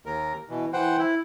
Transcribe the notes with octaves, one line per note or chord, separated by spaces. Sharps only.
D#2 A#4
B2 E3
E3 C5 F#5 G5
E4